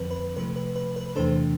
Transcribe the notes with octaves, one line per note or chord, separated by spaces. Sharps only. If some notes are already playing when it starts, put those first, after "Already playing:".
Already playing: F2 D3 F3 C4 B4
B4
C3 F3 A3 B4
B4
B4
B4
E2 C3 E3 A3 D4 A4 C5